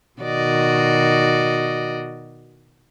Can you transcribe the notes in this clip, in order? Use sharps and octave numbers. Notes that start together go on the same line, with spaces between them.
B2 D#3 F#4 D5 D#5